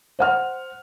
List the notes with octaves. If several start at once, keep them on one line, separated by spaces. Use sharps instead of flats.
C5 F#5 F6